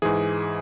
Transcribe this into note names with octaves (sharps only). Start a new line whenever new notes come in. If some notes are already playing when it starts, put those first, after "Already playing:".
G#2 E3 G#4